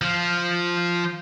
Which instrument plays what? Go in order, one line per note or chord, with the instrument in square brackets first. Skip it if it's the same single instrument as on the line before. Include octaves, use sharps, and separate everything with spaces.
[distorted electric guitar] F3 F4